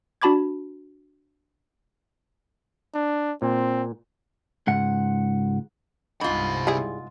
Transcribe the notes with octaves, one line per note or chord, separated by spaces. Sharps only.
D4 F#4 A5 B5 D6 G#6
D4
A#2 C4
C#2 G#2 F#5
G1 C2 G#2 C3 F4 B5
G3 E4 G#4